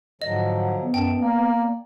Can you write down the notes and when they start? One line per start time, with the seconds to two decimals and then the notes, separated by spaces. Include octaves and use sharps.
0.22 G#2 D3 F3 F#3 D#5
0.81 B3
0.94 F#2 G5 A5
1.19 A#3 D5